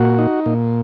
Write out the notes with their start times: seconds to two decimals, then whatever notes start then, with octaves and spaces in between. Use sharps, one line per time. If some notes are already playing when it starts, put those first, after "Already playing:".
Already playing: A#2 F#4
0.18 D#4
0.46 A#2